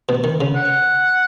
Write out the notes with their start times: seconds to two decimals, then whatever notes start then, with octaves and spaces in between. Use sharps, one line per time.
0.09 B2
0.24 D#3
0.41 C#3
0.56 F#5